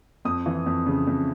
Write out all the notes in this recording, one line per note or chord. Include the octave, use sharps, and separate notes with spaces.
F2 D#6
E3
F2
C#3
F2